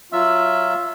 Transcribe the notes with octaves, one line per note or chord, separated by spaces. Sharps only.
F#3 F4 E5 E6